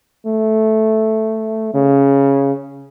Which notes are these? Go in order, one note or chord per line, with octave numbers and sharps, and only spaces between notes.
A3
C#3